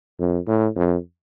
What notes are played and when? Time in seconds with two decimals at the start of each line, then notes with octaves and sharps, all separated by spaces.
0.19 F2
0.47 A2
0.76 F2